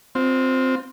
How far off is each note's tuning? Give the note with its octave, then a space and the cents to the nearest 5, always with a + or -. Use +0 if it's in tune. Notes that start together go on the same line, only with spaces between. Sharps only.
C4 +0 F4 +30